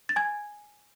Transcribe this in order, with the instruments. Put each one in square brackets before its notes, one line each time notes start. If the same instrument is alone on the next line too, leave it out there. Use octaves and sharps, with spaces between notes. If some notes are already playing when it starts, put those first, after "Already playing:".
[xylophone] A6
G#5 G#6